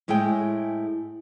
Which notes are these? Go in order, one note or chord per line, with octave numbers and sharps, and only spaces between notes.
A2 G#3 E4 G#4 G5